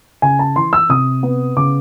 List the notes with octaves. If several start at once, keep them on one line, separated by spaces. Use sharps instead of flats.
C#3 G#5
A5
E3 C6
E6
C3 D#6
B3
C#3 D6